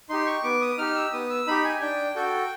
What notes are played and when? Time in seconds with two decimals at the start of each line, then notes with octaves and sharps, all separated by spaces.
0.09 D#4 G4 C6
0.26 C#6
0.44 B3 D6
0.61 D#6
0.78 D#4 G4 F6
0.95 E6
1.13 B3 D#6
1.30 E6
1.47 D#4 G4 B5
1.64 G#5
1.81 D4 G5
2.16 F#4 A4 G5